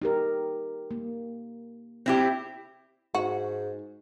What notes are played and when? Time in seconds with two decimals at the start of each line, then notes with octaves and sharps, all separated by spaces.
0.02 D#4 G4 A#4
0.91 A#3
2.06 C4 E4 G4
3.15 G#2 F#4